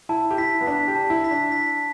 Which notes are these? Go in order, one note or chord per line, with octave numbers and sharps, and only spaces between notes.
E4 A5
G4
E4 B6
B3
D4 B6
G4
A5
E4
B6
D4
B6